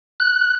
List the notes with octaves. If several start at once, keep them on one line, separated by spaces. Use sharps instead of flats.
F#6